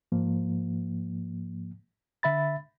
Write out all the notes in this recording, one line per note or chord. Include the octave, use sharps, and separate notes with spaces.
G#2 F3 A#3
D3 E5 B5 A6